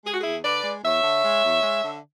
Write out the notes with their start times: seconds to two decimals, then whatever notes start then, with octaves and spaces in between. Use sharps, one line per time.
0.05 G#3 G#4
0.12 F#4
0.20 E2 E4 G#4
0.44 D3 B4 D5
0.63 G#3
0.84 E2 C#5 E5
1.03 D3
1.24 G#3
1.43 E2
1.63 G#3
1.83 D3